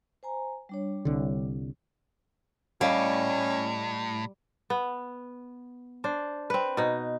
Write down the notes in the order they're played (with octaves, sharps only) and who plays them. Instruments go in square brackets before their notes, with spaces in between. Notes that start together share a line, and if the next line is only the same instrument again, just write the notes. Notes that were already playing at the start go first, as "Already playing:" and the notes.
[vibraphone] C5 G#5 A#5
G3 D4 C#5
[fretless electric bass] C2 D3
[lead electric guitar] A2 [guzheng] G3 [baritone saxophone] C#4 [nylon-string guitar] D#5 F5
[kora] B3
D4 C5
C4 B4
B2 D#4